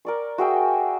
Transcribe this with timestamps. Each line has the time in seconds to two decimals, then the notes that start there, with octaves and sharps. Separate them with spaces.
0.05 A#4 D5 C#6
0.38 F#4 G#4 E5 G5